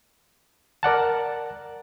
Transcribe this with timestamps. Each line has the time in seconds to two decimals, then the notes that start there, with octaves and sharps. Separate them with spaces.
0.83 A#4 D5 F#5 A5